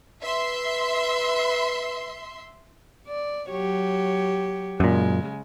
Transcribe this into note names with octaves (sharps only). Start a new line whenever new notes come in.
B4 E5 C6
D5
F#3 G4 C#5
F#2 A#2 C#3 G#3